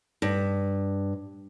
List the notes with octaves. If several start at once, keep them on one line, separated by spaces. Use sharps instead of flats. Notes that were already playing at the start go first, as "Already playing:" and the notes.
G2